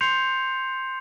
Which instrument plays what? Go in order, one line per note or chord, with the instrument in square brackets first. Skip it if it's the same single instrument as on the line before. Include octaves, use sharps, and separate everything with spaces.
[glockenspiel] C6 G6 C7 C#7 F7